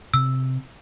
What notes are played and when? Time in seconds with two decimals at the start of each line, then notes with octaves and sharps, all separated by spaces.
0.14 C3 E6